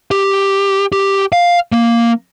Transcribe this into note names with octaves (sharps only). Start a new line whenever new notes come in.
G4
G4
F5
A#3